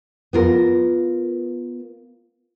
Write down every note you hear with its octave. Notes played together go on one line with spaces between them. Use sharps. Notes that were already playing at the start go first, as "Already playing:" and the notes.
B3 F4 A#4